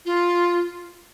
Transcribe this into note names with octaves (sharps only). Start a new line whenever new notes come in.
F4